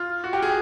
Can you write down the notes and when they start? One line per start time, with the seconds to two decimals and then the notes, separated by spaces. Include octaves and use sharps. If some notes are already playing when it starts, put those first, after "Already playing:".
Already playing: F4
0.24 F#4
0.33 G4
0.42 G#4